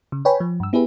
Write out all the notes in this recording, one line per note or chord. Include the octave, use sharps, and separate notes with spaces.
C#3
B4 C#5 G5 G#5 B5
F3
G2 E6
B3 E4 G4 G#4 B4